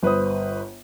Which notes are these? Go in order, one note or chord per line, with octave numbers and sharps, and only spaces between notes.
G1 B4 C5 D#6